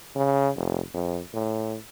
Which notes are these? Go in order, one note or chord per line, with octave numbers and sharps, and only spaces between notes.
C#3
F1
F2
A2